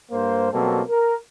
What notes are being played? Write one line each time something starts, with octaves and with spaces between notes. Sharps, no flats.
G2 A#3 C5
B2 F#3 G3 A#3 C4 A4
A#4